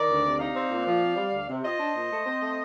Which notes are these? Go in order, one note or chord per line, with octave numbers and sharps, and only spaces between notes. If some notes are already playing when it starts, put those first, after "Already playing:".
Already playing: D#3 A#4 D5
D2
C3
D#4 D5 F5
C4
A#2
F3
C4
G3
D2
C3
F4 C5 D#5
D4
A#2
A3
C4
A3